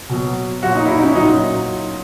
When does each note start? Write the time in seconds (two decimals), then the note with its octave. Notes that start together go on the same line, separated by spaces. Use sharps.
0.09 B2 F#3
0.63 A#2 F#3 F#4
0.75 D#4
0.85 E4
0.89 D#4
1.02 C#4
1.15 F#3 D#4
1.19 A#2